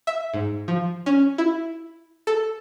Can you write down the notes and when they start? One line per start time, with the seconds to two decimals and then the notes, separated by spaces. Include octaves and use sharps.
0.07 E5
0.34 G#2
0.68 F3
1.06 C#4
1.38 E4
2.27 A4